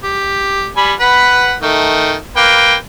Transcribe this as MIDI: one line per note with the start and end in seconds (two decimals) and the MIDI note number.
0.04 0.69 67
0.77 0.93 55
0.77 0.93 80
0.77 0.93 83
1.00 1.56 71
1.00 1.56 78
1.00 1.56 83
1.62 2.15 51
1.62 2.15 57
2.37 2.75 58
2.37 2.75 71
2.37 2.75 79